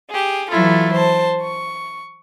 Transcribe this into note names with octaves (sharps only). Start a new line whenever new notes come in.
G4 G#4
E3 F#3 E4 F4 A4
C5 A5
C#6